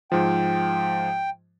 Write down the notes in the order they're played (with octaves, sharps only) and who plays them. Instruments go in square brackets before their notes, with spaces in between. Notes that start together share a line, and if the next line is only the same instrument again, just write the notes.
[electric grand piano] G#2 F3 [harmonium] G5